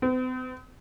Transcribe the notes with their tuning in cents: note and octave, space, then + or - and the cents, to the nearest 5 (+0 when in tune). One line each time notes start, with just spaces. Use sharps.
C4 -45